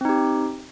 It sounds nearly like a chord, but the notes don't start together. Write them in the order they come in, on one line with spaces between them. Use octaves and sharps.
C4 D#4 G4